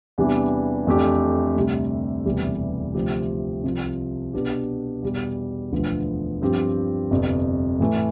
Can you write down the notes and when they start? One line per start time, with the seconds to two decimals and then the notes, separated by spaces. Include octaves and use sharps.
0.18 E2 C3 E3 G3 D4
0.87 F2 E3 A3 D4 G4
1.56 D2 C3 G3
2.25 E1 D2 C3 E3 G3
2.94 D2 C3 F3 C4 G4
3.64 C2 C3 F3
4.33 B2 B3 D4 G4
5.03 E2 B2 G3
5.71 E1 D2 D3 F3 B3
6.41 G2 F3 C4 G4
7.10 G1 F2 C3
7.80 A2 E3 A3